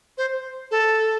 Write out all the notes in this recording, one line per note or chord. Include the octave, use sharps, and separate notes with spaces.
C5
A4